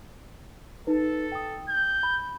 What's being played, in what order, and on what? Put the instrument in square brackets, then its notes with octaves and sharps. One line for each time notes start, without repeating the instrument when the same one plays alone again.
[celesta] D#4 B4 [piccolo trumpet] A4
[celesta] G5 D#6
[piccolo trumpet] G6
[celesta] B5